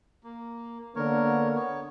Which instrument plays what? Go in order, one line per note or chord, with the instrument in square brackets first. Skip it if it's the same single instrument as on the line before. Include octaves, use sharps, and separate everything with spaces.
[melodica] A#3
[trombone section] D3 A#3 B3 [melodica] A#4 C#5
[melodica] B3 C#5